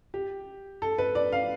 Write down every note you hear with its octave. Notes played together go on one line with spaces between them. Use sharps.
G4
A4
B4
D5
F5